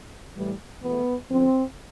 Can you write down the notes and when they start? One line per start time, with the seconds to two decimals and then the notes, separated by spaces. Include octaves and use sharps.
0.36 A2 E3 G3
0.82 E2 B2 A3 B3
1.29 F2 D3 F3 C4